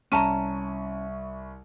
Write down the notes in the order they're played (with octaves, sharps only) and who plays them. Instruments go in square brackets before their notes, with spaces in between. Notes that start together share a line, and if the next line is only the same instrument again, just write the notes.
[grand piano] C2 C#6 D#7 [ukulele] C#4 A5 A#5